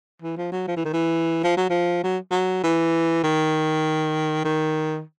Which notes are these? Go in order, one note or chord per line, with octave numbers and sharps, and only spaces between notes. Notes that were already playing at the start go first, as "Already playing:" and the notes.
E3
F3
F#3
F3
E3
D#3
E3
F3
F#3
F3
F#3
F#3
E3
D#3
D#3